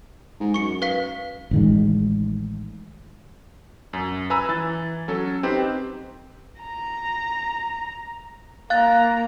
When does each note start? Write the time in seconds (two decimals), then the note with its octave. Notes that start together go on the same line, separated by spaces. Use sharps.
0.40 G#2
0.54 F#2 C#6 C#7
0.82 B4 F5 B6
1.51 A1 D#3 G#3
3.93 F#2
4.30 B4 G#5 A#5 B5 E6
4.49 E3 A6
5.08 F#3 C#4 A4
5.43 C4 D#4 G4 B4 C5
6.61 A#5
8.70 A#3 F5 A#5 F#6 A6